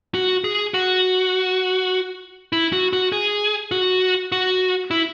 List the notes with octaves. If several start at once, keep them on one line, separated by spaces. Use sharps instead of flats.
F#4
G#4
F#4
E4
F#4
F#4
G#4
F#4
F#4
E4